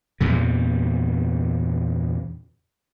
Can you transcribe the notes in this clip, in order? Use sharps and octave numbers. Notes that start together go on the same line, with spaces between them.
E2 G2 A#2 C#3